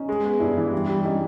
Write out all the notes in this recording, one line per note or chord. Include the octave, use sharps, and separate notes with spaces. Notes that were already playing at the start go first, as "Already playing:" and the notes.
Already playing: C#4 D#4
G#3
B3
G2 D4 E4
E3
G3
G3
G3 C#4 D#4